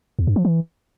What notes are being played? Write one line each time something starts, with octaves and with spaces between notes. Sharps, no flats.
E2
G2
F3
E3